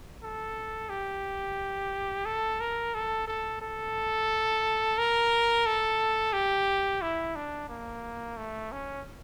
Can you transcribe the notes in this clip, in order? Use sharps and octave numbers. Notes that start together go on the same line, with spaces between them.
A4
G4
A4
A#4
A4
A4
A4
A#4
A4
G4
E4
D4
A#3
A3
C#4